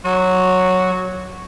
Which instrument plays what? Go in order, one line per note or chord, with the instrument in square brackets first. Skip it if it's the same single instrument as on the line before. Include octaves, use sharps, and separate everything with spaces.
[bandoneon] F#3 [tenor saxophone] F#4